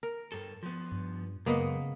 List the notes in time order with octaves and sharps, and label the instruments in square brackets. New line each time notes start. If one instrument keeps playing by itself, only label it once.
[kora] A#4
[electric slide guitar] G2 A4
F3 B3
[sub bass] G2
[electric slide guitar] F#2 G#3 [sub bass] C#3 [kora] A#3 B3 D#5